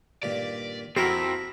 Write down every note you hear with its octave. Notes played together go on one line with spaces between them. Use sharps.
G2 A#2 D#3 D5
F2 C4 E4 F#4 A#4 G5 A#5 B5